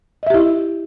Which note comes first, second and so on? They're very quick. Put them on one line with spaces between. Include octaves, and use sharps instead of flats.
D#5 E5 G4 E4